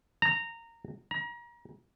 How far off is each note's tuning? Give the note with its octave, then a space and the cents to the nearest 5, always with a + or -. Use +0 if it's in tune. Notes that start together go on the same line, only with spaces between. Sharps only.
A#5 -15
A#5 +35